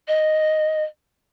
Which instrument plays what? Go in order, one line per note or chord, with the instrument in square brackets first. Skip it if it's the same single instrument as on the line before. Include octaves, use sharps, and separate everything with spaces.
[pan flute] D#5